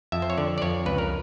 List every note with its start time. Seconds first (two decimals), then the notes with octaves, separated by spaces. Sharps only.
0.12 F2 E5
0.22 C5
0.30 C#5
0.37 D3 D5
0.58 D5
0.62 F2 C#5
0.86 C#2 B4
0.98 A#4